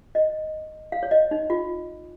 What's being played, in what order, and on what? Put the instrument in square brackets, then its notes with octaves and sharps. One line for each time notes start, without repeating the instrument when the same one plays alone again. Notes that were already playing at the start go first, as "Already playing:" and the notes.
[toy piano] D#5
F5
C#5
D#5
D#4
F4